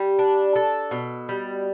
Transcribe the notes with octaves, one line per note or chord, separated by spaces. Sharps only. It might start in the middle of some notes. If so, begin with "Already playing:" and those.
Already playing: G3
D4
A4
B2
G3